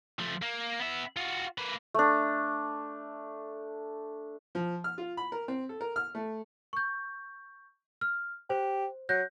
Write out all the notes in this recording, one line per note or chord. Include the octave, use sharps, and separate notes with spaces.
F3 A3
A#3
B3 E5
F4 F#4
A#3 B4
A3 D4
F3
F6
F4
B5
A#4
C4
A4
A#4
F6
A3
C#6 G6
F6
G4 C5
F#3 F#6 G6 A#6